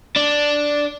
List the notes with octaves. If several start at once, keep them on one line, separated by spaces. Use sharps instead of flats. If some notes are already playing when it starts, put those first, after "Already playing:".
D4